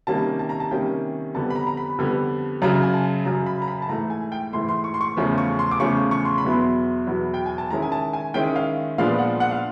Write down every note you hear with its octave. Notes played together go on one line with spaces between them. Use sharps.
C3 D#3 G3 A#3 C#4 A5
A5
A#5
A5
C3 D#3 G3 A#3 C#4 G5
F2 D3 G3 B3 A5
B5
A#5
A#5
B5
F2 D3 G3 B3
F#2 C#3 F#3 A#5
G#5
A5
F#2 C#3 F#3 A#5
B5
A#5
B5
A5
G#2 E3 A3 A#5
G#5
G5
G#2 E3 A3 C6
C6
C#6
C6
C#6
E2 C#3 F3 A3 C#4
C#6
C6
D6
E2 C#3 F3 A3 C#4 C#6
C#6
C6
B5
E2 B2 F#3 B3 E4
C6
E2 B2 F#3 B3 E4
G5
G#5
A5
D#3 G#3 C#4 E4 A#5
G#5
A5
G#5
D#3 G#3 C#4 E4 G5
F5
A#2 F3 G#3 B3 D4 F5
F#5
F#5
F5